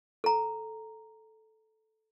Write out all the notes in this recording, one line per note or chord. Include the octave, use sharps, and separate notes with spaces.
A4 A#5